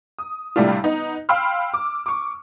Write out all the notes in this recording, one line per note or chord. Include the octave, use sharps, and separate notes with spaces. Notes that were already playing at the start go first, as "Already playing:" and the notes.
D#6
A2 C3 G3 A3 D4 F4
B3 D#4
F5 G5 B5 C6 E6 F6
D6
C#6 D6